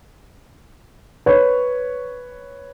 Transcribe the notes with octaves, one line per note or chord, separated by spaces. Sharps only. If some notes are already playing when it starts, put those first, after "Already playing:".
B4 C#5